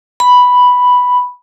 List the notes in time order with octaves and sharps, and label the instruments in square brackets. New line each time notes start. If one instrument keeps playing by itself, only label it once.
[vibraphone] B5